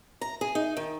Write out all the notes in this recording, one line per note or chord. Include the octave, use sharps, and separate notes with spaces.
A#5
G#4
D#4
D#3